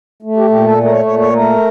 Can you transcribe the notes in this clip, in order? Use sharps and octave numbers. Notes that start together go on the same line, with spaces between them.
A3
G4
A#2 G4
A4
A3
A#4
C#5
A#2 C#5
C#5
A3 A#4